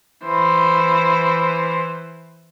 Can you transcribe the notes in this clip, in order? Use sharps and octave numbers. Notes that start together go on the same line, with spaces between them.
E3 C5